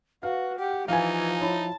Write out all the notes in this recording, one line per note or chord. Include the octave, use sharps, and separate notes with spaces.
F#4 B4 F5
G4 F#5
E3 F3 D#4 F5 G#5
E4 C#5 A5